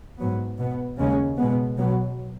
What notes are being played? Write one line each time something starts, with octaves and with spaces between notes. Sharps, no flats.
G#2 F#3 B3
B2 B3
D#2 C#3 G#3 C#4
B2 G#3 B3
B2 F#3 B3